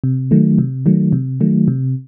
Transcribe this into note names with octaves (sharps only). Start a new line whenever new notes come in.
C3
D#3 F#3 A3
C3
D#3 F#3 A3
C3
D#3 F#3 A3
C3